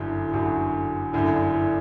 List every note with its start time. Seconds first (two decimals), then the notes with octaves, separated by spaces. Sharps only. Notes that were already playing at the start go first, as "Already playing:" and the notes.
Already playing: G1 F#2 D3 E4 F#4
0.28 E4
0.33 G1 F#2 D3 F#4
1.13 G1 F#2 D3 E4
1.33 D4
1.54 E4